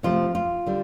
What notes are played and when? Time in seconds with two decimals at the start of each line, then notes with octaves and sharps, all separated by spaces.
0.03 C3 F3 A3 F4
0.35 F4
0.66 D3 G3